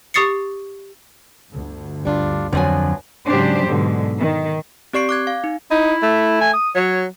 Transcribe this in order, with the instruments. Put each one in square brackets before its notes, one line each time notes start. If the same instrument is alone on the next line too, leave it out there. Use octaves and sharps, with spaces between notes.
[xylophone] G4 C#6 D#6 A6 C7 C#7
[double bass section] G1 D2
[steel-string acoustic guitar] G3 D4 F4
[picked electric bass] F2 D3 [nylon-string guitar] F3 F#3 G#5 [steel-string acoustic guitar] B3
[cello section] G#2 C#3 F#3 D4 G4 C5
G#2 B2 D3 F#3
D#3
[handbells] C4 G4 D5 C#6 C7 D7
D6 F#6 G#6
F5
D#4
[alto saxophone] D#4 [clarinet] E4
[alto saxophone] A3
[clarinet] G#5
D#6
[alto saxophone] F#3 [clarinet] C#5